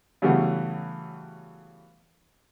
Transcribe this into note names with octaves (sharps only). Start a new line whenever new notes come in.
C#3 E3 F#3 G3 A3 B3